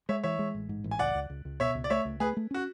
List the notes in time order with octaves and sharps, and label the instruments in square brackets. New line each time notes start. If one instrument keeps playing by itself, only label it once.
[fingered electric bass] G#3 [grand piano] C#5 E5
[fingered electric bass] E3 [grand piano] C#5 E5
[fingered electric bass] G#3
A1
G#2
A1
[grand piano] G#5
[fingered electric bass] C#2 [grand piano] D5 F#5
[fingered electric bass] C#2
C#2
C#2
[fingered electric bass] B2 [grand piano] C#5 E5
[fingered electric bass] C#2
[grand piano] D5
[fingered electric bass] A3 [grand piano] C#5 E5
[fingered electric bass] C#2
[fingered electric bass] A3 [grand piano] G#4 B4
[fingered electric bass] A3
[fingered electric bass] C#4 [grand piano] F#4